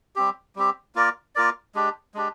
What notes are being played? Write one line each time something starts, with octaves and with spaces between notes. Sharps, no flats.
G3 C4 G4
G3 C4 G4
A#3 F4 A#4 D5
A#3 F4 A#4 D5
G#3 D4 G4
G#3 D4 G4